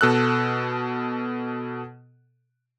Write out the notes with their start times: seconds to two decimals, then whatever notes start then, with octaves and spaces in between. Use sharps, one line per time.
0.01 B2 A4 E6 F#6